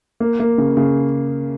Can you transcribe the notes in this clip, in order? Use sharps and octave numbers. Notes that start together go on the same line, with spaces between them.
A#3
A#3
C#3
C#3